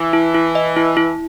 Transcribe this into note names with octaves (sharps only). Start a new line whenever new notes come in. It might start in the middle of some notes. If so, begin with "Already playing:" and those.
Already playing: E3
E4
E4
D#5
E4
E4